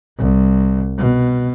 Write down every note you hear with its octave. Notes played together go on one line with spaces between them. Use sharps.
C2
B2